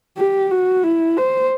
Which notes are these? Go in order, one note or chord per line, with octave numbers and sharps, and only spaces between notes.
G4
F#4
E4
C5